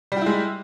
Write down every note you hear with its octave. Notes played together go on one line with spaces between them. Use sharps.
G3 G#3 E4 G4